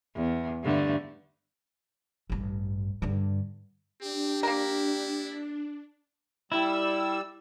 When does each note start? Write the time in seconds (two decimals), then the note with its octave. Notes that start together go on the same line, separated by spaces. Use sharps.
0.15 E2
0.63 G2 D3 A3
2.30 A1 G2
3.02 G2 D3
4.02 C4 D4 G4
4.43 A#3 E4 A#4
6.52 G3 E4 E6